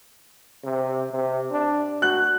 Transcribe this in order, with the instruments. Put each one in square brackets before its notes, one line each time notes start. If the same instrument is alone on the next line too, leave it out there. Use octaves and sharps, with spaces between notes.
[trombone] C3
C3
D4
[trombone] F#4 [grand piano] F#6